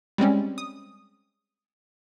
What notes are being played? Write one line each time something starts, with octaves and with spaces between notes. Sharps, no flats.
G3 G#3 C4 C#4
D#6